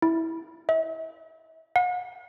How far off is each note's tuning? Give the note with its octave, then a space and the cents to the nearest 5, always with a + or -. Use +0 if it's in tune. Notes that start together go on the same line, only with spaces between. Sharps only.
E4 -10
E5 -40
F#5 -45